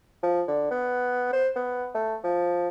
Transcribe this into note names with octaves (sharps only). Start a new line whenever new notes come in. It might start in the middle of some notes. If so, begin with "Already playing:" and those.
F3
D3
B3
C5
B3
A3
F3